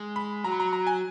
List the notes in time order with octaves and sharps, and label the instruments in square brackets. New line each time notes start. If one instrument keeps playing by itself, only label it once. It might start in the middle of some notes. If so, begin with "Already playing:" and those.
Already playing: [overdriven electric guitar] G#3
[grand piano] B5
[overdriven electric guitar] F#3 [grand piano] A#5
[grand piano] B5
A#5
A#5
G#5